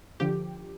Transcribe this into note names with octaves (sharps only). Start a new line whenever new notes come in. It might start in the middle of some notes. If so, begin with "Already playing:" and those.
D3 F3 G4